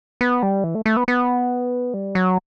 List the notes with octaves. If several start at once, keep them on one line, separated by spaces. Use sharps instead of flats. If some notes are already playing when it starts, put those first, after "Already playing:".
B3
G3
E3
A3
A3
B3
B3
G3
F#3